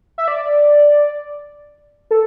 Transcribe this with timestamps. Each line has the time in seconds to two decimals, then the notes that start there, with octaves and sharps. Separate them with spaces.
0.18 E5
0.28 D5
2.11 A4